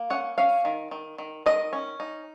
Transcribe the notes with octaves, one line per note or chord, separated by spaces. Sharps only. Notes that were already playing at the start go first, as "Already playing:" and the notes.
Already playing: A#3
C#4 F#5
C#4 F5
D#3
D#3
D#3
D#3 D#5
C#4
D#4